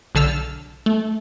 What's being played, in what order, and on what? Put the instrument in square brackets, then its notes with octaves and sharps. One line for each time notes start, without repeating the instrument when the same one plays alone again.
[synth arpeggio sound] B1 D3 A5 E6 F6
A3